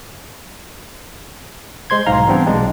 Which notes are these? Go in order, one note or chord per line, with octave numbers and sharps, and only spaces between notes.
G#3 C5 C6 G#6
B1 G#2 F5 A#5
E3 G3 B3 C4 D4
B1 G#3 D4